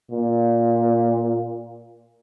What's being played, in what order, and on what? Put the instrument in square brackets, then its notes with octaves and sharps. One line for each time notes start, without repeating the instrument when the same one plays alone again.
[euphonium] A#2